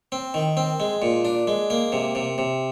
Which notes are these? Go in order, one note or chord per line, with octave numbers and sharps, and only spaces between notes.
C4
D#3
C4
G#3
A#2
D4
G#3
A#3
C3
C3
C3